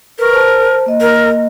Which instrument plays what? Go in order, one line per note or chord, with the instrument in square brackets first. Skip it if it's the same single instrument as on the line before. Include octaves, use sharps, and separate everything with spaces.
[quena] A#4 [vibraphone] B4 C#6
[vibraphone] C5 A5
A#3 D#5
[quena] A#4